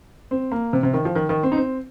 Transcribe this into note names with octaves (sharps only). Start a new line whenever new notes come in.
C4
A#3
C3
C3
D#3
F3
D#3
D#3
C4
D#4
C4